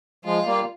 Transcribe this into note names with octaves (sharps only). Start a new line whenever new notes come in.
F3 G#3 F4
G3 A#3